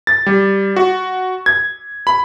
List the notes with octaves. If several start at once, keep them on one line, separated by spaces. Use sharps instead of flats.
A6
G3
F#4
G#6
B5